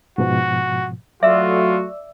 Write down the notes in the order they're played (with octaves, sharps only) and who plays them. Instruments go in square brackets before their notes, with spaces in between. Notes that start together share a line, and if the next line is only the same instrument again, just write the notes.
[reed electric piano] G#2 B2 F3 [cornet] F#4
[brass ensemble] F#3 A3 F#4 [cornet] F4 [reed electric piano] D5 E6 [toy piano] E5